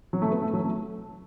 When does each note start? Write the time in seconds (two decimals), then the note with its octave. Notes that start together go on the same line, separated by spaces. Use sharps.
0.13 F#3
0.22 A3
0.32 B3
0.42 A3
0.53 F#3
0.64 A3